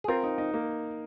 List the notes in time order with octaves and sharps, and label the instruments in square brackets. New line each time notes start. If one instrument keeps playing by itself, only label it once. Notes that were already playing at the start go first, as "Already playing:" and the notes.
[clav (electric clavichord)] G#4
[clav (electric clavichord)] C4 F4 [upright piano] A#4
[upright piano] D#4
D#4
A#3